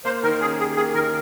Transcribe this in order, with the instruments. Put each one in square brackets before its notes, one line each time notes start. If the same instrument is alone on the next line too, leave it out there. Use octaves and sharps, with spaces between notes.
[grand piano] A#3 [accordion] C5
[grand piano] D#3 [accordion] A#4
[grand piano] C#4 [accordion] G#4
[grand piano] G4 [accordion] G#4
[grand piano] A#3 [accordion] G#4
[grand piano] D#3 [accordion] A#4